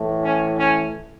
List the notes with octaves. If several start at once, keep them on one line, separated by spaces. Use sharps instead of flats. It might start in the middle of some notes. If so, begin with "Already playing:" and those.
Already playing: A2 E3
C#4
C#4